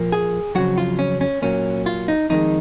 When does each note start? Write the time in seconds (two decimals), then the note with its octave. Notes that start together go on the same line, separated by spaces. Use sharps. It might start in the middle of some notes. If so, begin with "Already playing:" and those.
Already playing: A#2 F3 A#3
0.12 G#4
0.55 F2 C#3 F#3 F#4
0.78 F4
0.99 C#4
1.21 C#4
1.42 A#2 F#3 A#3 C#4
1.86 F4
2.08 D#4
2.30 F2 D#3 G#3 D#4